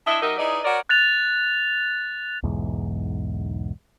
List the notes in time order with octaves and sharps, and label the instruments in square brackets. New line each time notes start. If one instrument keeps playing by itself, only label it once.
[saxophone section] D4 E4 D#5 E5
F#3 D#4 G4 A#4 D#5 E5
D#4 E4 G#4 B4 D5 D#5
F#4 A#4 C#5 D5
[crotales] F#6 A6 F7
[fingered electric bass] B1 E2 G#2